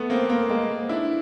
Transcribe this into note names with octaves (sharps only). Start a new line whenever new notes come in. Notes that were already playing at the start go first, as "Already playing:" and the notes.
Already playing: A3 B3
A#3 C4
A#3 C4
G#3 A#3
D4 E4